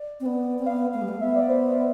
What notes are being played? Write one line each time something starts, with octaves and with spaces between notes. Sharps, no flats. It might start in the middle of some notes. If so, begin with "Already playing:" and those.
Already playing: D5
C4
B3
C4
B3 F5
A3 F5
G3
A3
B3 E5
D5
C5